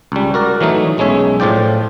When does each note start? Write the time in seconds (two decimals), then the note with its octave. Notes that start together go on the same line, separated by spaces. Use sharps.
0.12 C#2 G3
0.34 F#4 A#4 D5
0.61 E3 F#3 A3 D#4
0.98 B1 G#3 C#4 C#5 E5
1.40 A2 F3 F4 D5 G5